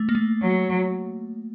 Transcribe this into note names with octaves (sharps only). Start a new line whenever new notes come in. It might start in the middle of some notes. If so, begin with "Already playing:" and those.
Already playing: A3
A#3
A3
F#3